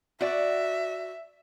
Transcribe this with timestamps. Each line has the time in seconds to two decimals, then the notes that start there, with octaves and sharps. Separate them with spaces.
0.21 F#4 D5 E5